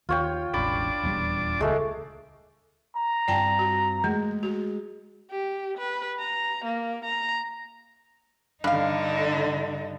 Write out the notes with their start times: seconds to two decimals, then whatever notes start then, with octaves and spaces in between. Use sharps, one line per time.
0.09 D#2 F4 C#5 G5
0.54 E1 A1 D4 D5 B5 D6
1.03 D#1 E2 G3
1.60 D#1 C#2 G#3 A3
2.96 A#5
3.28 G2 C4 F4 D5 G5 A5
3.59 F#4
4.04 G#3 A3
4.43 F#4
5.31 G4
5.78 B4
6.19 A#5
6.65 A#3
7.05 A#5
8.64 G2 D3 D#4 F5